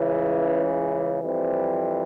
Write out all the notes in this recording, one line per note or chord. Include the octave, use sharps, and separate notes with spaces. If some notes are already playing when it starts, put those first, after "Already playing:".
Already playing: C#2 C#3 E3
F2 E3 G3 C4